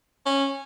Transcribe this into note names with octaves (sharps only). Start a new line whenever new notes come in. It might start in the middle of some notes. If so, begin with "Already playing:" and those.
C#4